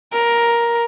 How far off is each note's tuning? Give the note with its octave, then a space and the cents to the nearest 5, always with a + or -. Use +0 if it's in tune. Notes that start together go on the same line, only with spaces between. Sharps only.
A#4 +10